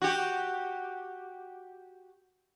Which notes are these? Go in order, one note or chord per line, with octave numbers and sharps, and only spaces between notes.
F#4 G4